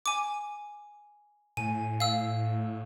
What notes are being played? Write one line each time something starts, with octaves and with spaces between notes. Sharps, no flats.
G#5 D6
A2 G#5
F5 E6